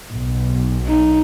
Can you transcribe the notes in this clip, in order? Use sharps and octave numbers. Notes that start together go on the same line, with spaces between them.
B1
D#4